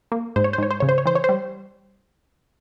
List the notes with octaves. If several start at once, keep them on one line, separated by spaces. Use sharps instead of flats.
A#3
G#2 C5
C#5
C5
G#2 C#5
C5
C#3 C#5
C5
C#5
E3 C5
C#5
C5
G3